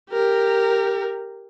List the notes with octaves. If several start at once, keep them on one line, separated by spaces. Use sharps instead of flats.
G4 A#4